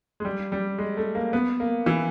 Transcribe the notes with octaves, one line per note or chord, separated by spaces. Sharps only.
G#3
G3
G3
G#3
A3
A#3
B3
A#3
E3